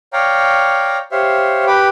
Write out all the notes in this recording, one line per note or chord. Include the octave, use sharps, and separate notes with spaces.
C#5 D5 F5 G5 A#5
G4 C5 C#5 E5 F5
G4 B4 G5 B5 D6